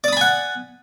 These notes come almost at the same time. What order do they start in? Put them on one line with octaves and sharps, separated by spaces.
D5 D#6 B5 G#5 F#5